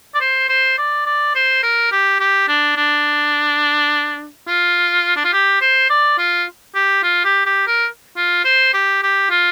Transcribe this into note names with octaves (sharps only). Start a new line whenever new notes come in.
D5
C5
C5
D5
D5
C5
A#4
G4
G4
D4
D4
F4
D4
F4
G4
C5
D5
F4
G4
F4
G4
G4
A#4
F4
C5
G4
G4
F4